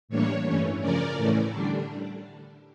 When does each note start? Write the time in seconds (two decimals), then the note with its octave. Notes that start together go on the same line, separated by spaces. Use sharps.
0.09 A2 E3 G3 A#3 D4 C#5
0.45 G2 E3 A3 C#4
0.80 C#3 F3 C#4 A#4 D5
1.16 A2 E3 A3 C#4
1.52 D3 G3 D4